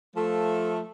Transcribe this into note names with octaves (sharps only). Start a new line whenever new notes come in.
F3 A3